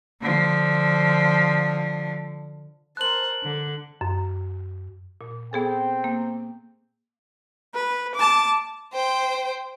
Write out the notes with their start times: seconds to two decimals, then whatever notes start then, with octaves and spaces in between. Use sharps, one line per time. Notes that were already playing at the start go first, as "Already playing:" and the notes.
0.22 D3 F3
2.97 A#4 C5 A5 F#6 F#7
3.44 D3
4.01 F#2
5.21 A#2
5.53 B3 C4 G#4 A4 G5
6.04 A#3
7.75 B4
8.15 A5 D6
8.93 C5 G5